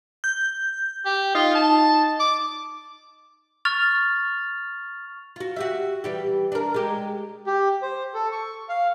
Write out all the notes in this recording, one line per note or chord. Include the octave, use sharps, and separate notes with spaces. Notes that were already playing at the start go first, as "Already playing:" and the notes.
G6
G4
D#4 F4
A5
D6
C#6 F6 A6 F7
F4 F#4
F#4 G4 E5
E3 G3 G4
D4 A#4
G#3 G4
G4
C5
A4
C#6
F5